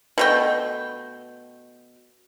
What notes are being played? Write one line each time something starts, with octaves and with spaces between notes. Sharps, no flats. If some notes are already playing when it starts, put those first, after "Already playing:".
B2 A3 G5